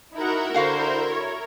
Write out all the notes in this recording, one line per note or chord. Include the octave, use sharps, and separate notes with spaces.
D#4 E4 F#4 A#4 F#5
D3 F#4 C5 F5 F#5 C6
C#5